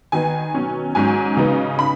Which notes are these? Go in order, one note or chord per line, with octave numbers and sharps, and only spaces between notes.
D#3 B3 D#4 G#5
B2 F#3 C#4
G#2 F#3 C#4 G#5
C#3 B3 D#4
B5